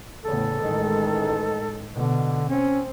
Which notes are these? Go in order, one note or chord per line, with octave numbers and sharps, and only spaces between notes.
E2 A2 C#3 A4
A1 D#3 G#3
B2 D3
C4 C#4